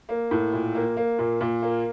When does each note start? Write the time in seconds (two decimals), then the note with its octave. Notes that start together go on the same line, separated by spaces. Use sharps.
0.09 A#3
0.31 A2
0.53 A#2
0.75 A#3
0.97 A#3
1.19 A#2
1.41 A#2
1.62 A#3